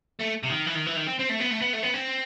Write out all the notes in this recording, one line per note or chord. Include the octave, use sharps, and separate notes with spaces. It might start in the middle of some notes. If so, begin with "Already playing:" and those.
A3
C3
D#3
E3
D#3
E3
D#3
C4
C4
A3
B3
A3
B3
A3
B3
C4